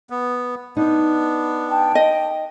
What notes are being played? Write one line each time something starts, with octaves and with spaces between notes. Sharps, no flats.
B3
B3 D4 D#4
G5 A5
D#5